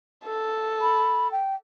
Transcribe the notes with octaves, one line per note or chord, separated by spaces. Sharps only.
A4
B5
G5